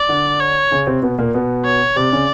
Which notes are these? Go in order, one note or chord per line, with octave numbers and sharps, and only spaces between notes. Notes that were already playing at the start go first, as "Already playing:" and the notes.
Already playing: D5
D3 D4
C#5
C#3 C#4
C3 C4
B2 B3
A#2 A#3
B2 B3
C#5
C3 C4 D5
C#3 C#4